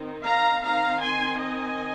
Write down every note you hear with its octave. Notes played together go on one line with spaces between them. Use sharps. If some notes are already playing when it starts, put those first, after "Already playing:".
Already playing: D#3 C4 D#4
F5 A#5
D#3 C4 D#4 F5 A#5
G#5 C6
D#5 G#5